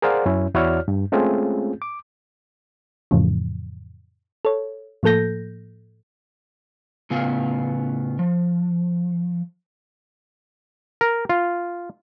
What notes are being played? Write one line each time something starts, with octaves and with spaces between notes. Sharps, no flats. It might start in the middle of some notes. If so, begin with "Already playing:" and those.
G#4 A#4 C5 D5 F5 F#5
F#2 C#4 E4
E2 E4 F#4 C#5 D5 F6
G2
G#3 A3 C4 C#4 F4 G#4
D6
F2 A2 C#3 E3 F3
A4 C#5
A2 F3 A#3 A4 G6 A#6
A2 C#3 B3 F4 F5
F3
A#4
F4